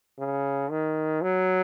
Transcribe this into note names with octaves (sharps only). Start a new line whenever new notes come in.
C#3
D#3
F#3